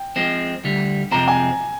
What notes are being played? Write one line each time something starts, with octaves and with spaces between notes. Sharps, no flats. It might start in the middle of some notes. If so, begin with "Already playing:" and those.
Already playing: G5
F3 G#3 C4
D2 D3 G3
F2 C3 F3 G#3 C4 A#5
G#5